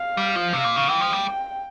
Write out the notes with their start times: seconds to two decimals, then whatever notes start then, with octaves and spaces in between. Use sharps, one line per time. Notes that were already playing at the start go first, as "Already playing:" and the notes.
Already playing: F5
0.17 G3
0.36 F3
0.53 C3
0.64 A#2
0.76 C#3
0.88 E3 G5
1.01 F3
1.13 G3